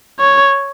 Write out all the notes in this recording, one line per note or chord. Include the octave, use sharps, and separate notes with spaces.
C#5